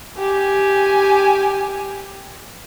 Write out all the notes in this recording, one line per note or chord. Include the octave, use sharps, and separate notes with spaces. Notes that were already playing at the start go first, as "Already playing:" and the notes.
G4 G#5